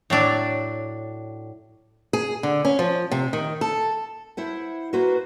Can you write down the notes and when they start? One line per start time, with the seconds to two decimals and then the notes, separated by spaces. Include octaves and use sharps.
0.10 A2 F#3 D4
2.13 G#4
2.43 D3
2.65 C#4
2.79 F3
3.11 C3
3.33 D#3
3.61 A4
4.37 E4 C5 F#5
4.93 A#3 F#4 B4 C5